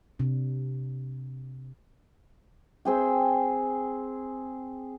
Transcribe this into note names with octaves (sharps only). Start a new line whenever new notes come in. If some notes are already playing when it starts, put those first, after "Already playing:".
C3 D4
C4 G#4 G5